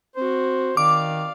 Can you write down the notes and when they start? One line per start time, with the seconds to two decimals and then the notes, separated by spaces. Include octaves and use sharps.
0.16 C4 F#4 C5
0.77 D#3 D5 F5 D6